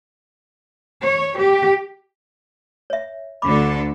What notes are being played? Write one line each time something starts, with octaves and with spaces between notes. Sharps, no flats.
C#5
G4
C#5 E5
D2 D3 A4 B5 D6